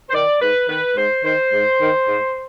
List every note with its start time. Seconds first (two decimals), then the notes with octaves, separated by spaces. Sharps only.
0.09 C5
0.13 D#3 D5
0.41 G#2 B4
0.69 D#3 B4
0.96 G#2 C5
1.24 D#3 C5
1.52 G#2
1.80 D#3
2.07 G#2